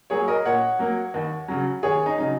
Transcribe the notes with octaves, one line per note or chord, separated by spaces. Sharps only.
F#3 A#3 G#4 C#5
A#4 D#5
A#2 C#5 F#5
F#3 A#3
D#2
C#3 F#3
D#2 G#4 C#5
D#4
C#3 F#3 D#4